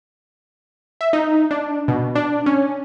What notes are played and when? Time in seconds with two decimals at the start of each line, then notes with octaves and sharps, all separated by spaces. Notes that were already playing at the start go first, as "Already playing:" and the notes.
1.01 E5
1.13 D#4
1.51 D4
1.88 B2
2.15 D4
2.46 C#4